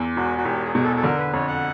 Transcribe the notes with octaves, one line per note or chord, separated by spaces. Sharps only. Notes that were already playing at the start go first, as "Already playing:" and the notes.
Already playing: E2
E1 F#4
F#4
E1 G4
G#4
B2 G#4
A4
A4
D3 A#4
B4
F2 C#5
F#5